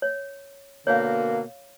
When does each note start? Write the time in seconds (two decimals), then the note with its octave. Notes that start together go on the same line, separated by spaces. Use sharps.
0.02 C#5
0.87 B2 D3 A#3 C#5 F5